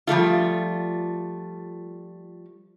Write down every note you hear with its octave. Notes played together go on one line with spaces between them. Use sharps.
F3 G3 A3 F4